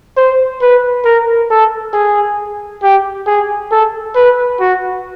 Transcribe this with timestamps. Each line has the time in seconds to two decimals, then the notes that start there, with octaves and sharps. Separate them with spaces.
0.17 C5
0.62 B4
1.05 A#4
1.50 A4
1.93 G#4
2.82 G4
3.27 G#4
3.71 A4
4.15 B4
4.60 F#4